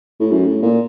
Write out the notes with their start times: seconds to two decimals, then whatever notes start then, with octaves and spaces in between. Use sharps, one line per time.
0.20 A2
0.31 F#2
0.46 A2
0.63 A#2